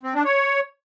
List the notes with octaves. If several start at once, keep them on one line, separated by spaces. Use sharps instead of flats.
C4
D4
C#5